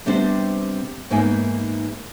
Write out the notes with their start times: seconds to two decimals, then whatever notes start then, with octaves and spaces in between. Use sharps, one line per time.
0.06 C3 G3 B3 C4 D4 C5
1.10 G#2 E3 A#3 B3 D#4 G#5